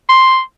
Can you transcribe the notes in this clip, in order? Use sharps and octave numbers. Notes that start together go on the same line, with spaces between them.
C6